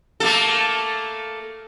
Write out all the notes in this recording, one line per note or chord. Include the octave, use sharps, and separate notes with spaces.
A3 A#3 A4